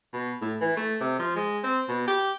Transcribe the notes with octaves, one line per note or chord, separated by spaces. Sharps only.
B2
A2
E3
A3
C3
F3
G#3
C4
B2
G4